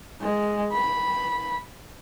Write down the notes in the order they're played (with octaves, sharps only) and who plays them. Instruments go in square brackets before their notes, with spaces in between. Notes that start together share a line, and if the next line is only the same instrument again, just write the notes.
[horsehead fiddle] G#3
B5